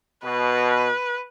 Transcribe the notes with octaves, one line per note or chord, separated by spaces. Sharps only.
B2 B4